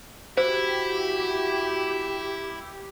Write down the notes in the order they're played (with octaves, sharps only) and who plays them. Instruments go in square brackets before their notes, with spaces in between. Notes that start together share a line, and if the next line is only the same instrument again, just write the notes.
[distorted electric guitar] E4 [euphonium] F#4 [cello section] G4 [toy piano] C5